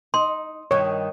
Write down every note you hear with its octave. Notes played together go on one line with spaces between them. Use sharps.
D#4 C6
G2 D#3 C#5